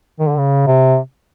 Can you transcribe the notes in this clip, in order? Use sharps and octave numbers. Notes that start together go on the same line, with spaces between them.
D#3
D3
C#3
C3